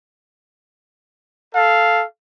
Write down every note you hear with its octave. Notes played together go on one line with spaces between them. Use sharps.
A4 F5